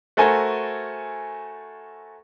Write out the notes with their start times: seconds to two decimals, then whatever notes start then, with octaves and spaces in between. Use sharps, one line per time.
0.17 A3 F#4 A4 A#4 C5 G#5